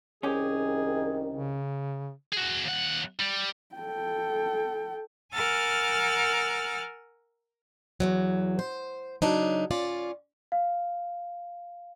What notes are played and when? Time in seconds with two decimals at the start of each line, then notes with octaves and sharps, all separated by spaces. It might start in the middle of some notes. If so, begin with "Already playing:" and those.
0.23 C2 D#3 C#4 G4 G#4
1.34 C#3
2.32 F#4 G#4
2.64 D#2 F#5
3.20 G3
3.76 A4 G5
5.34 A#4 F#5 G#5 E6 F6 A6
8.00 E2 G2 F#3
8.59 C5
9.22 C#3 F#3 D4 D#4
9.71 C#4 F4 D5
10.52 F5